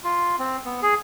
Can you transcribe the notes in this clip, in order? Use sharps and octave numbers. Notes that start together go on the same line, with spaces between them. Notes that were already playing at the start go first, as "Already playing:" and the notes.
F4
C4
B3
G#4